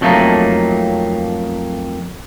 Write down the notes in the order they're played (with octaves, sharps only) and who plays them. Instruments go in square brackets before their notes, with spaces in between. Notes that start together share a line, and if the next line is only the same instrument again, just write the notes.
[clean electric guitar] F2 F#3 A3 A#3 D#4